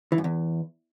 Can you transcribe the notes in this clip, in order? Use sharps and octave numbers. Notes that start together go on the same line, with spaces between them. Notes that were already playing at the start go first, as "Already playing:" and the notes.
E3
F#2
E2